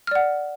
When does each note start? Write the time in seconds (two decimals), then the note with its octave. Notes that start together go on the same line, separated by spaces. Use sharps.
0.07 F6
0.11 D5
0.15 F#5